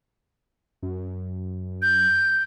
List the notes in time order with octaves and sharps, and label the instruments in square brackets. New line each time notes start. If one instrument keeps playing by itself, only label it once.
[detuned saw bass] F#2
[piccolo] G6